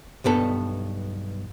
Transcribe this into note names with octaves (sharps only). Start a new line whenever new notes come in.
B1 G2 B3 A4